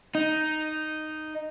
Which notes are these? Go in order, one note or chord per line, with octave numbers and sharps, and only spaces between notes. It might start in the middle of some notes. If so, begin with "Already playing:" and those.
D#4